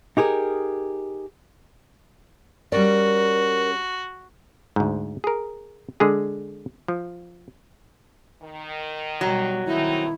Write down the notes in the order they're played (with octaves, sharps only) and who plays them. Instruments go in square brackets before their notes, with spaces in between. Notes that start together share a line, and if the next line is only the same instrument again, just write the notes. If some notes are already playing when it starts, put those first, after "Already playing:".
[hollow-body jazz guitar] D#4 G4 G#4 A#4
[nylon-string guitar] G3 C#4 D5 [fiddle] F#4 [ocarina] A#4
[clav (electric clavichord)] D2 G#2
G#4 A#4
D3 G#3 G#4
F3
[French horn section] D#3
[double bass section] B2 G3 [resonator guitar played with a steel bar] F#3
[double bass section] D#3 [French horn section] A3 C4 D#4 [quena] E4